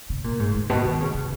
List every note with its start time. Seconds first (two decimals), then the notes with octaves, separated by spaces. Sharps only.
0.10 C#3
0.24 A#2
0.40 G#2
0.55 G#2
0.70 B2
0.85 D#3
1.00 C#3
1.14 C#3